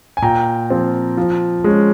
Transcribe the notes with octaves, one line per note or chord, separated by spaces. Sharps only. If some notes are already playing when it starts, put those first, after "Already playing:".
G#5
A#2 G5 A#5
F3 C4
F3
G#3 C#4